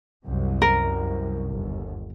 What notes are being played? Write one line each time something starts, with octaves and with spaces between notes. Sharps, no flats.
C2 F#2 C3
A#4
G1 D#2